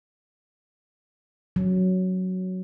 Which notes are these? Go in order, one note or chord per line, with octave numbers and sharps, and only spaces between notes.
F#3